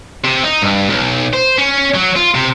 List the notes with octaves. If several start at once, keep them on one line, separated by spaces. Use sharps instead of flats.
C3
D#4
G2
B1
C5
C#4
F#3
F4
C3